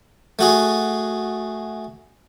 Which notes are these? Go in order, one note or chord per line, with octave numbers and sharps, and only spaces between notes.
A3 F#4 G#4